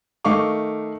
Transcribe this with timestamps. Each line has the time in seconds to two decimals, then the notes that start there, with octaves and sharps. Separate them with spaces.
0.24 D#3 A3 D#5 F5 C#6 D6